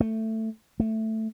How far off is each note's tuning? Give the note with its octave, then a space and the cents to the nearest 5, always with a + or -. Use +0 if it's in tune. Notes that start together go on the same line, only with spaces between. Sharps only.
A3 +10
A3 +5